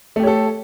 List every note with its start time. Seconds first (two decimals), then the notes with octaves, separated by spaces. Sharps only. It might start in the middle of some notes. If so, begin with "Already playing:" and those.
0.16 A3
0.20 G4
0.23 C#5
0.27 A4